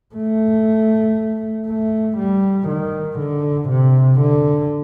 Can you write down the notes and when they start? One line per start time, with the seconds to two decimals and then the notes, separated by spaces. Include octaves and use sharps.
0.15 A3
1.67 A3
2.18 G3
2.68 D#3
3.19 D3
3.69 C3
4.20 D3